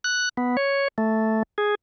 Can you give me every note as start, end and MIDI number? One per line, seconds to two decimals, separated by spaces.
0.04 0.29 90
0.37 0.57 59
0.57 0.88 73
0.98 1.43 57
1.58 1.75 68